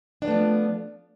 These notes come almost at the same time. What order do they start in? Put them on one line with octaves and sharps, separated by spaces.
D4 B3 A3 F3